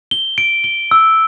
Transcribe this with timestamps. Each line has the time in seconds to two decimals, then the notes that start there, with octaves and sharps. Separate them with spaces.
0.11 G7
0.38 D7
0.64 G7
0.91 E6